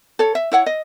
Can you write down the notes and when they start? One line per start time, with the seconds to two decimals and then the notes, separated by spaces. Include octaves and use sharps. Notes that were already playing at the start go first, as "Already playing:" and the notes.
0.19 A4 C#5
0.35 E5
0.52 E4 C#5 F#5
0.66 D#5